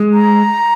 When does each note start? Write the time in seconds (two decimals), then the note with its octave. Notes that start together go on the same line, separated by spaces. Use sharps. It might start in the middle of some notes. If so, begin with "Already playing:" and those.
Already playing: G#3
0.13 A#5